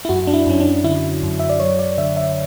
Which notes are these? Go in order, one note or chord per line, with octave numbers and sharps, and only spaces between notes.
E4
F#2 F#4
D4
E4
F#2 C#4
D4
D3 E4
F#2
E5
D5
F#3 C#5
D5
D3 E5
E5